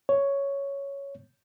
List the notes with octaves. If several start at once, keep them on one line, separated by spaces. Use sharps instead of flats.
C#5